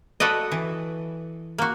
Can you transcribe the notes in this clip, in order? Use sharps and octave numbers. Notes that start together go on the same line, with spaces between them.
F#4 A4 B4 D5 D#5
E3
A#3 F#4